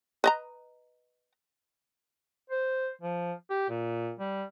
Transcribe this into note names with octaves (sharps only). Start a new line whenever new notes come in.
B4 D#5 A#5
C5
F3
G4
A#2
G3